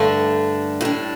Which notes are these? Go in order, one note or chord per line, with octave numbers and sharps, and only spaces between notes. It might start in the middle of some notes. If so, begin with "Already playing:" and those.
Already playing: G2 D3 A3 D4
A2 G3 D4